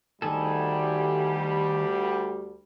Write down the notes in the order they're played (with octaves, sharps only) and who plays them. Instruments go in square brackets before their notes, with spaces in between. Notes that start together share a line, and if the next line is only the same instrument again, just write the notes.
[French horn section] D2 G3 [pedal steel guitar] D#3 G#4 A4